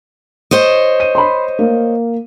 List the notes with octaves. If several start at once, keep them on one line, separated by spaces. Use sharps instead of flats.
C5 C#5 D#5
D#7
B5 C6
A#3